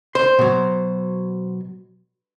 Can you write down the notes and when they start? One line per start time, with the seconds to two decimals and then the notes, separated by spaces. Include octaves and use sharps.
0.15 C5 C6
0.39 B2 F#3